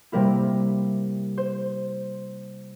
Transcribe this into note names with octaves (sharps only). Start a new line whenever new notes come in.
C3 G3 A#3 E4 A#4
C5